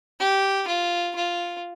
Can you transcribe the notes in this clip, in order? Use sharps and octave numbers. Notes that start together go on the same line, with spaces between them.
G4
F4
F4